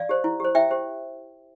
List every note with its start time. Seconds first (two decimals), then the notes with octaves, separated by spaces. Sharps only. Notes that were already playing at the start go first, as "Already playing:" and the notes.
Already playing: D5 F5
0.09 G4 C5
0.24 E4
0.40 G4 C5
0.55 E4 E5 G5
0.71 G4 C5